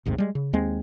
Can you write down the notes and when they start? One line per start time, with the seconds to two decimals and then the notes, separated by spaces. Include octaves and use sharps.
0.05 A1 D#2 G#2 C3
0.18 G3 G#3
0.35 C#3
0.53 D#2 G#3 C4